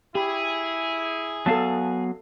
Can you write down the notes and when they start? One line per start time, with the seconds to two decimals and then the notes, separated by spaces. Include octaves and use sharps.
0.15 E4 G4 G#4 B5
1.46 F#3 B3 A4 F5 A5